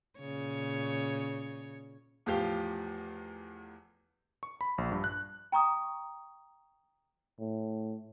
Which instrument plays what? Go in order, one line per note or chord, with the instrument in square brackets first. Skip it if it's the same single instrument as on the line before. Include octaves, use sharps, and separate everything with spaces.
[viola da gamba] A#2 C#3 C#5
[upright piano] E2 A2 F3 G4 F5 G7
[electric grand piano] C#6
B5
A#1
G2
F#6
[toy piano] G5 A#5 C#6 D#6
[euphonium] A2